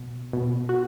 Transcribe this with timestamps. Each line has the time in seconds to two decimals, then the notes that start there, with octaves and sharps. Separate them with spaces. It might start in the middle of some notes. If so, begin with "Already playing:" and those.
Already playing: B2
0.33 B2
0.69 F#4